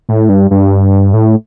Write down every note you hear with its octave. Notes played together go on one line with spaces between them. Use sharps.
A2
G2
G2
A2